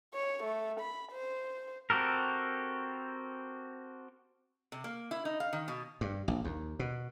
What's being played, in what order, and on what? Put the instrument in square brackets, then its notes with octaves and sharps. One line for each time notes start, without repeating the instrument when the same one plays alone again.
[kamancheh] C#5
A3
B5
C5
[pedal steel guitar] C4 F#4 G4 A4 A#4
[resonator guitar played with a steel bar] C3
A#3
E4
D#4
F5
D#3
B2
[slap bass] G2
A#1
D#2
B2